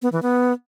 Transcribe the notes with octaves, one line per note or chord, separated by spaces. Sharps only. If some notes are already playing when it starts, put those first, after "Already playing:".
B3
E3
B3